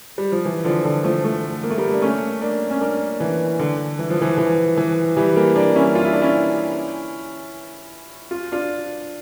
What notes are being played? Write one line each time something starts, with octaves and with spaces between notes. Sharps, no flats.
G3
F3
E3
D3 F3
D3
F3 A3
F3 A3
A#3
A3
G3 A#3
D4
A3 C#4
A#3 D4
C#4
A#3 D4
E3
D3
E3
F3
E3
E3
E3
E3 G3
G3 A#3
A#3 D4
C#4 E4
F4
E4
D4
C#4 E4
F4
D4 F4